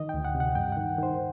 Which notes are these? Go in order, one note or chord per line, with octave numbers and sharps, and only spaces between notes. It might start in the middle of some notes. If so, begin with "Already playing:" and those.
Already playing: D#3 D#5
G5
D2
F#5
C3
F#5
G2 G5
D#3 F#5
D#3 C5